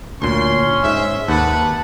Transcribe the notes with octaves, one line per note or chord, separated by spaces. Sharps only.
D2 A#2 C#4 C6
G#2 E5
D#2 B4 F#5 A5